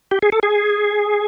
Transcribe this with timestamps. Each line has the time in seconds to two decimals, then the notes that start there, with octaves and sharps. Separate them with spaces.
0.11 G4
0.22 G#4
0.32 A4
0.43 G#4